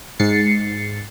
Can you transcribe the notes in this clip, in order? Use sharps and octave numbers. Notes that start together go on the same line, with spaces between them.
G#2 A6 C7 C#7